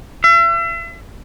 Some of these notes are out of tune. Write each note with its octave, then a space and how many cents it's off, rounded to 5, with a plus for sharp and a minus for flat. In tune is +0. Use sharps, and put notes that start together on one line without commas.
E5 +40